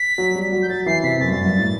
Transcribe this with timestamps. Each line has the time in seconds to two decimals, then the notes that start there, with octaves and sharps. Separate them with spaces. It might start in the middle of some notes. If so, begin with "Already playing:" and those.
Already playing: B6
0.18 F#3
0.35 G3
0.52 F#3
0.62 G6
0.69 F#3 A6
0.86 E3 C7
1.03 C3 B6
1.20 F#2 A6
1.28 G2
1.33 F#2
1.46 G2
1.59 A2